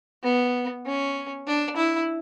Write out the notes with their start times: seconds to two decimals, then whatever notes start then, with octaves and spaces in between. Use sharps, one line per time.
0.23 B3
0.85 C#4
1.47 D4
1.77 E4